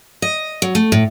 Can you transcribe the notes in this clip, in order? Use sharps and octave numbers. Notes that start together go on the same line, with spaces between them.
D#5
F#3
A3
A2